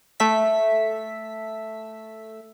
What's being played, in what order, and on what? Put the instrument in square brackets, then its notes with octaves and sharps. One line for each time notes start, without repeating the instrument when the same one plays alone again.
[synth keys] A3 E5 B6